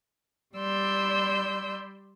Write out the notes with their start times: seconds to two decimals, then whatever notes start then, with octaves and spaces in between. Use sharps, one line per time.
0.56 G3 D5 B5 C6 E6 G6